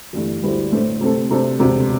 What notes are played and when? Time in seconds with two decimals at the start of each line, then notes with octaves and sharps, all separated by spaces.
0.13 G1 G2 E3 A3
0.43 D2 D3 G3 E4 C5
0.72 A2 A3 D4 C5
1.01 C3 A3 C4 A4
1.30 C3 A3 D4 A4 C5
1.59 E1 D2 C3 A3